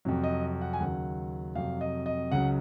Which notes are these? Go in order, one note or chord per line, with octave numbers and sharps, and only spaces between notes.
F2 C3 F#3
D#5
F#5
G#5
D#2 C#3 F#3 F#5
F2 C3 F#3 F5
D#5
D#5
C#2 C#3 F#3 F#5